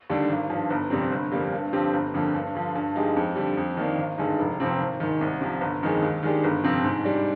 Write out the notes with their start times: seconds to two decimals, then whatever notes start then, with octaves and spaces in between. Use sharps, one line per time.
0.10 D#2 D3 G3 D4
0.29 G#1
0.50 G2 F3
0.70 G1
0.90 F2 C3 G3 C4
1.12 G1
1.32 F2 D3 G3 A#3
1.52 G2
1.73 D3 F3 C4 G4
1.93 G1
2.14 F2 D3 F3 A#3
2.35 G2
2.55 D3 F3
2.75 G2
2.95 F3 G#3 D#4 G4
3.16 F2
3.36 D3 G3
3.57 F2
3.77 D#3 A#3 D4
3.98 G#1
4.18 G2 D3 G#3 D#4
4.39 F1
4.60 F2 C3 F3 C4
4.80 G#1
5.00 G#2 D#3
5.21 C2
5.41 C3 F3
5.61 G1
5.83 F2 D#3 G#3
6.02 D#2
6.23 D#3 G#3 D4 G4
6.44 G1
6.64 F2 C3 F3 C4
6.84 G#2
7.05 G3 D4